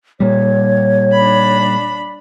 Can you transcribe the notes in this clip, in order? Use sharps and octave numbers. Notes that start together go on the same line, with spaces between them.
A#2 G3 C#5
D4 B5